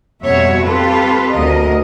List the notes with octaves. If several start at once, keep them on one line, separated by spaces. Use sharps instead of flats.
F2 B2 G3 F#4 C#5 E5
C4 F4 G4 A4 B4
D2 A#4 D#5